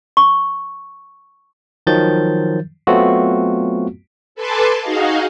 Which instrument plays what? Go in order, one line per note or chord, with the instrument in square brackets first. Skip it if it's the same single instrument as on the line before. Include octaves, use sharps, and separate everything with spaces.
[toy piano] C#6
[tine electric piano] D#3 F3 F#3 G6 A6
F#3 A3 B3 C4 F4 F#4
[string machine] A4 B4 G#5 A5 C6 D6
D#4 F#4 G#4 D#5 F5